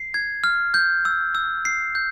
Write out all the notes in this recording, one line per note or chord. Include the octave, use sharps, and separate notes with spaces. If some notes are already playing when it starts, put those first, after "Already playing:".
Already playing: C7
G#6
F6
G6
E6
E6
C7
G6